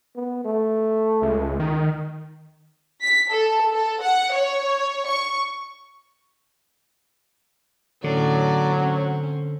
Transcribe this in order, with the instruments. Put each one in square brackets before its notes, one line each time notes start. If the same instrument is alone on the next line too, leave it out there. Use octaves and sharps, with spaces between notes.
[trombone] B3
A3
[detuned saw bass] C#2
D#3
[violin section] B6
A4
A4
F#5
C#5
C#6
[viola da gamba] A2 C#4 D5 [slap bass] D3 [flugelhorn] F#3
[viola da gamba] C4 C#4